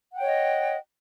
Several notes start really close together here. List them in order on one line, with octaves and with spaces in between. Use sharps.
F#5 G5 C#5 D#5